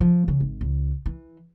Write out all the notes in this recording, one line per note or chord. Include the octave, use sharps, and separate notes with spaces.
F3
C#3
G#1
C#2
E3